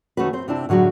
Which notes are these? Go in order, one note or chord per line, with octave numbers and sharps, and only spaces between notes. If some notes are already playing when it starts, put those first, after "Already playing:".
C3 D#3 A3 C#4 F#4 B4
C4 C5
C3 C4 D4 E4 A5
A2 D3 F#3 G#3 F#4